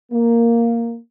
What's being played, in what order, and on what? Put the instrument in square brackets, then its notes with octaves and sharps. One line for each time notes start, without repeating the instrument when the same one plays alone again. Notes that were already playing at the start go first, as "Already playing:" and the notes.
[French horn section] A#3